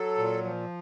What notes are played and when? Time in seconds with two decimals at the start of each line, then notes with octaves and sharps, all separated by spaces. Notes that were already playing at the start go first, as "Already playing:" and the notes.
Already playing: F#3 A4
0.18 A#2
0.45 F3